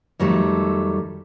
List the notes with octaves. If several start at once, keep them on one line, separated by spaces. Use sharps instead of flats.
F2 D#3 F#3 G3 A3 A4